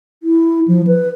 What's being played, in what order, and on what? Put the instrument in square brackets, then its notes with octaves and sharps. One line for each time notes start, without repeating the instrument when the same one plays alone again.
[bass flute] E4
F3
B4